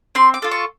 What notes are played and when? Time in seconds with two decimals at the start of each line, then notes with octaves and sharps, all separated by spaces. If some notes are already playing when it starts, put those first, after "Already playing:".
0.15 C4 C6
0.34 D6
0.42 F4 A4
0.51 C#6